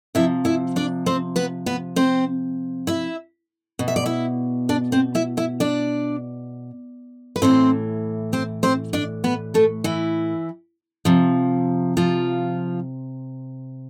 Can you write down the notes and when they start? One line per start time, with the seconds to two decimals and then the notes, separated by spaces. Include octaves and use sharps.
0.15 C3 F3 E4 E5
0.45 E4 E5
0.76 D4 D5
1.06 C4 C5
1.36 B3 B4
1.66 B3 B4
1.96 C4 C5
2.87 E4 E5
3.79 B2
3.88 E5
3.96 D5
4.06 E4 E5
4.69 D4 D5
4.92 C4 C5
5.15 E4 E5
5.37 E4 E5
5.60 D4 D5
7.36 B4
7.42 A2 E3 C4 C5
8.33 C4 C5
8.63 C4 C5
8.93 D4 D5
9.24 B3 B4
9.54 A3 A4
9.84 E3 E4
11.05 C3 F3
11.97 F3 F4